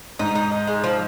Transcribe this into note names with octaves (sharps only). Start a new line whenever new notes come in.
G#2 D#4
D#4
D#4
G#3
F3